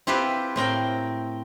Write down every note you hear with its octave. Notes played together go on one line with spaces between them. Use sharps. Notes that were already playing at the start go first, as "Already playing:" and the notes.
C4 E4 F4 G4 B4 C5
A2 C4 A#4 G5